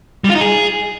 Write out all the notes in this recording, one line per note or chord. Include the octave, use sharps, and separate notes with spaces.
G3
F4
D#4
G#4